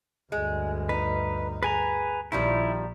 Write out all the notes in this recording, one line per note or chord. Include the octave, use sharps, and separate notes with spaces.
D2 G2 G#3
D#4 B4
G#4 B4 G#5 A#5
A#1 D#3 F3 G3 E4